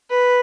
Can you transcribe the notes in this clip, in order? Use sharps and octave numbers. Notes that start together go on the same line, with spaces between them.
B4